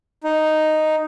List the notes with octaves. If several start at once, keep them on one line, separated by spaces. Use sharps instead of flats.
D#4